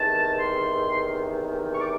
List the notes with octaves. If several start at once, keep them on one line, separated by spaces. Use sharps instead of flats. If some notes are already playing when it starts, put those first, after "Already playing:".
Already playing: E2 C3 D#3 A5
C6
C#6
D6